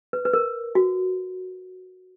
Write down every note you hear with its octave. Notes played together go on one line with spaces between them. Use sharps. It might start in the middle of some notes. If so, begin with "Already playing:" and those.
B4
B4
A#4
F#4